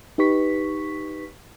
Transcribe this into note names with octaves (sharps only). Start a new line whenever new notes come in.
D#4 G4 B4 C#6 B6